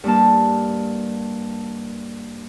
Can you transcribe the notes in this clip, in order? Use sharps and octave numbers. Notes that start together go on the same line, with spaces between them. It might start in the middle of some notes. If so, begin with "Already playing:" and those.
G2 G3 A#3 A5